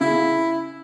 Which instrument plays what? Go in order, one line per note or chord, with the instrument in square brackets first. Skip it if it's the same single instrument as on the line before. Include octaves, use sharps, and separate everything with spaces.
[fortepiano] C#3 [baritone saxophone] E4